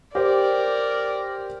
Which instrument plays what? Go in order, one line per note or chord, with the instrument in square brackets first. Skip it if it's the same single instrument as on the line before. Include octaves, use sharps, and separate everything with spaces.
[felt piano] G4 C5 [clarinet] A#4 [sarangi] D5